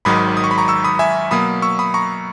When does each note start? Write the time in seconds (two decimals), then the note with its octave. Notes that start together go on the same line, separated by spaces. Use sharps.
0.05 G#1 G#2 D#3 F#3 B5 D#6
0.37 D#6
0.44 C#6
0.51 B5
0.58 A#5 C#6
0.68 C#6 E6
0.84 B5 D#6
0.99 E5 G#5
1.31 B2 F#3 A#3 B5 D#6
1.62 C#6 E6
1.79 B5 D#6
1.94 A#5 C#6